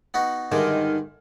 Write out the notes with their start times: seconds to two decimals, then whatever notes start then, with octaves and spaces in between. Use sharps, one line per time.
0.14 B3 D#4 F#4
0.52 G2 D3 D#3 G#3